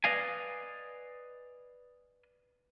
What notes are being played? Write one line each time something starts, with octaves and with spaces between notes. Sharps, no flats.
B4 D5 D#5 F5 G#5